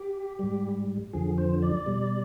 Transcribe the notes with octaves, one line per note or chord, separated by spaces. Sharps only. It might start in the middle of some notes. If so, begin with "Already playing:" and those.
Already playing: G4
G#2 G3
F2 D3 F3 G#4
C5
D5
B2 G3